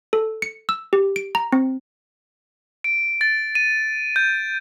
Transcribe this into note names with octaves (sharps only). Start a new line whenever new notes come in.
A4
C#7
E6
G4
D7
A#5
C4
D7
A6
D#7
G6